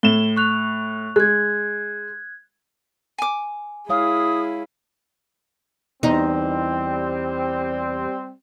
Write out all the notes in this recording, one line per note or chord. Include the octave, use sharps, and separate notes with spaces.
A2 E7 G7
C#6 F#6 F7
G#3 F#6 G#6
G#5 D6
G#3 E4 G#4 C#5 F5 D#6
E2 G3 C4 D#4